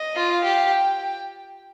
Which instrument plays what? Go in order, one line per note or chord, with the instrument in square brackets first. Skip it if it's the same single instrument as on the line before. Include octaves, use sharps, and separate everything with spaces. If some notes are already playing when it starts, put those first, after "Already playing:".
Already playing: [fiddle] D#5
[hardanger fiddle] F4
[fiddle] F5
[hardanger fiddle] G4
[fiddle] G5